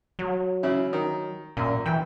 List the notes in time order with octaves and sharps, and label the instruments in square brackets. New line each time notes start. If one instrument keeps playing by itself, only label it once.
[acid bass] F#3
[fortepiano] C#3 E4
D#3
[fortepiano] F#2 [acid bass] A#2
[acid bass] E3 [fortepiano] G5